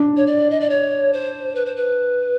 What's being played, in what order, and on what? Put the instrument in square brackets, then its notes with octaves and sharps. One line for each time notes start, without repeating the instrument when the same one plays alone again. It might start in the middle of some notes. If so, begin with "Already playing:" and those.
Already playing: [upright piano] D4
[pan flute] C#5
D5
D#5
D5
C#5
C5
B4
C5
B4